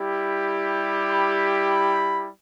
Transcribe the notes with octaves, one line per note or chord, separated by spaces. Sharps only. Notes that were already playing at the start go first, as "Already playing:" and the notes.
Already playing: G3 E4 G4
B5